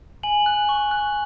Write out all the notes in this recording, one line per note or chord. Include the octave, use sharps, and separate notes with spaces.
G#5 F#7
F#6
C#6
F#6